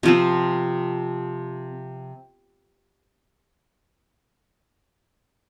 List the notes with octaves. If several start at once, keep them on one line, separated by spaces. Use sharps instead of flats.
C3 F3 C4